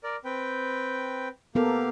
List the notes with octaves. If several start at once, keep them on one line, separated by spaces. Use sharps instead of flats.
A#4 D5
C4 B4 G5
A#3 B3 G4 A4 A#4 F5